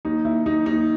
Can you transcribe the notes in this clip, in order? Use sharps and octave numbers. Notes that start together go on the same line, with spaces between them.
D#2 D#4
D#2 E4
D#2 D#4
D#2 D#4